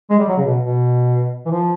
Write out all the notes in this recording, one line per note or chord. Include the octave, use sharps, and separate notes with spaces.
G#3
G3
F#3
C#3
B2
B2
E3
F3